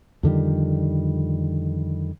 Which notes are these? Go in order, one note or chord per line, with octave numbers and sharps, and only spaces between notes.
F2 D3 D#3 G3